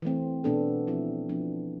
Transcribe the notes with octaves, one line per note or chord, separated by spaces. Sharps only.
E3 A3 C4
B2 B3 D4 A4
F3 C4 E4
F3 B3 D4